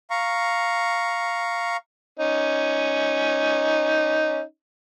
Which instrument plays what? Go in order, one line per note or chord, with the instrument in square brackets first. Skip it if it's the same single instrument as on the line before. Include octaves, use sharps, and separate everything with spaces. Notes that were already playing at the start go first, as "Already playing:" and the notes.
[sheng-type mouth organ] F5 A#5 C#6
[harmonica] C#4 D#4